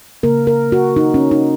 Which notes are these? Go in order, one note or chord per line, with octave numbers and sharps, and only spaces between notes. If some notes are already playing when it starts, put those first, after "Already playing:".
C#3 A#3 A#4
A#4
F#4
D#4
C#4
D#4